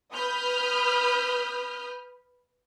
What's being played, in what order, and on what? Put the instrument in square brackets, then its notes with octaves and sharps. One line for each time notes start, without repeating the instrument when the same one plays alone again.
[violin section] B4 B5 D#6 F6 G6